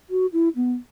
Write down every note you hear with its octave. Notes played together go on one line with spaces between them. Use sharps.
F#4
E4
B3